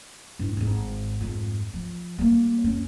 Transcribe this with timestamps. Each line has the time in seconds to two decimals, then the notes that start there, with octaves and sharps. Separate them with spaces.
0.39 G2 E4
0.57 G#1 G#2
1.21 F2 G#2
1.74 F3
2.18 G3 A#3
2.64 F2 C#4